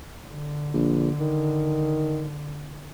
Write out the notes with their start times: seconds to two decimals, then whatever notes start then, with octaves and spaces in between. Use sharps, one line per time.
0.26 D3
0.73 A#1
1.20 D#3